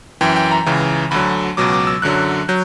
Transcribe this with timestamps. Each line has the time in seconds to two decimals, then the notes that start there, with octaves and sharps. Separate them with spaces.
0.21 F#2 E3 G5
0.36 G5
0.51 A#5
0.66 C#2 C#3 E3
1.11 D2 D3 F#3 B5
1.57 C#2 B2 F#3 D6
1.73 D6
1.87 E6
2.02 F#2 D3 F#3 F#6
2.49 F#3 G6